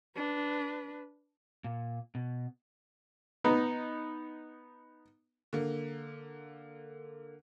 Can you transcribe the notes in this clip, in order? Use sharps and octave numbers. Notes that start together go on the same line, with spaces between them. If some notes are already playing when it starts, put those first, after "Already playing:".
D4 B4
A#2
B2
B3 D#4
D3 A#3